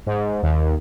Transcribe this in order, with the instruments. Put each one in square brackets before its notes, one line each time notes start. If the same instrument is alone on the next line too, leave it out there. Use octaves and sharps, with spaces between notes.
[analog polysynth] G#2
D#2